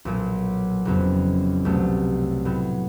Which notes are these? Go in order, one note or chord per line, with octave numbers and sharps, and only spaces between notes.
B1 A#2 F#3
F#1 F2 C#3 F#3 B3
C2 B2 F#3 A3
A2 F#3 B3